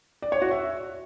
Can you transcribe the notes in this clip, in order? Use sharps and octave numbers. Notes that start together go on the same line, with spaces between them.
D5
C#5
F#4
E5